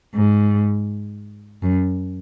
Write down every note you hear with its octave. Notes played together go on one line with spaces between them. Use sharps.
G#2
F#2